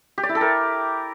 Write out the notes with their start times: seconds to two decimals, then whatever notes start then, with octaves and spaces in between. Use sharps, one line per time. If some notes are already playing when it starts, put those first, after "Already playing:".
0.18 G4
0.23 D5
0.29 E4
0.35 A4
0.41 A#4